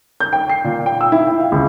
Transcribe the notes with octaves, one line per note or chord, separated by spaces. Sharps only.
G6
G5
C7
A#2
G5
E6
E4
G5
F5
C#2